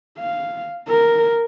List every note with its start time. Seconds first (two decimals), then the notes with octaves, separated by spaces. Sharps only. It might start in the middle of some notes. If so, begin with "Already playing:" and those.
0.19 F5
0.89 A#4